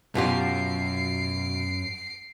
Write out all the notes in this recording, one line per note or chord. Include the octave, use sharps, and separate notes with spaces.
F#2 B2 F4 G4 C7 D7